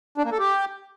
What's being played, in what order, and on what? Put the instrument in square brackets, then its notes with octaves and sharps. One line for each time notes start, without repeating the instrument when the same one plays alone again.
[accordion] D4
A#3
A4
G4